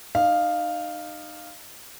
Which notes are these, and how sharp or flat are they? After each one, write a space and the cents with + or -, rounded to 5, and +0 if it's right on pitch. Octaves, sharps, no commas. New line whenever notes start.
D#4 -30 F5 +0